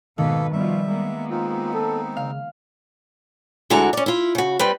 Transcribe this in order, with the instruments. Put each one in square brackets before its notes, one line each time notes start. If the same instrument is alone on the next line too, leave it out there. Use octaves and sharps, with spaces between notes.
[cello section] G#2 B2 B4 [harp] D#3 [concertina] A#3 A4
[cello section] B2 F3 F4 [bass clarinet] G3 [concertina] E5
[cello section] G#3 A#3 B3
[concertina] C4 D#4 [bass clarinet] F4
[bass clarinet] A4
[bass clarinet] C#3 [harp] F5
[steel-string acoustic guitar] D2 D3 G#3 E4 F#4 A#5
C#4 D5
E4 F4
C#3 F#4
G3 C4 B4